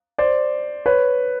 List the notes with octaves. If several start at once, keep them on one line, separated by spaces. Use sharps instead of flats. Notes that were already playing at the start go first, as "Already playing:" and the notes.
C5 D5
B4 C#5